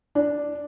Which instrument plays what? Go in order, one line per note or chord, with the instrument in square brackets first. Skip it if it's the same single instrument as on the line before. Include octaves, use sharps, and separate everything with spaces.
[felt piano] D4